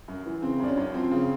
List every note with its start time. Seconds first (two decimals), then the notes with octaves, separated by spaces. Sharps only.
0.08 F#2
0.26 E3
0.42 C#3 C4
0.60 F#2 D4
0.68 C#4
0.77 F#2
0.94 F3 C4
1.11 C#3